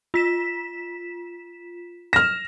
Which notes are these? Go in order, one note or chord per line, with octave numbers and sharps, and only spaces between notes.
F4 B6 E7
F6 A#6 E7